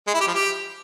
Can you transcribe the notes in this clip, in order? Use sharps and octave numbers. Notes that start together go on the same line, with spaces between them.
G#3
E4
G4
F3
G4